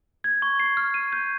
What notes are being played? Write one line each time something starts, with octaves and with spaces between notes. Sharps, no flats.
G#6
C#6
C7
F6
D#7
G6